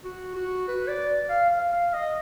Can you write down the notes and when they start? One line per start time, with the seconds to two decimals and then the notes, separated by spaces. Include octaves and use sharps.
0.05 F#4
0.36 F#4
0.68 B4
0.88 D5
1.30 F5
1.51 F5
1.73 F5
1.93 D#5